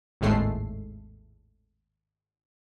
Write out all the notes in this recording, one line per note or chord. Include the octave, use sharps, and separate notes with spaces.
G#1 D#2 A2 G#3 A3 C7